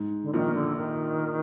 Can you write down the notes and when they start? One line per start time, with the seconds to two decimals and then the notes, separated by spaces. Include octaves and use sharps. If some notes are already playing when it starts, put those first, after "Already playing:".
Already playing: G#2
0.23 D3
0.34 A#1 A#2 D#3
0.55 D3
0.77 D#3